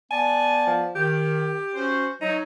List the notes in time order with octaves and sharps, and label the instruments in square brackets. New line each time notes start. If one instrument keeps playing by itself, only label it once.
[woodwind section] B3 D5 A5 [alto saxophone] G#5
[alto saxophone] F3
[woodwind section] D#3 [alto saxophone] G4
[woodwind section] C#4 F#4 C5
[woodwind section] F#3 [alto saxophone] D#4